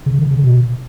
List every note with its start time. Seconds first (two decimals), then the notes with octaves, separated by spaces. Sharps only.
0.06 C#3
0.18 D3
0.31 C#3
0.43 B2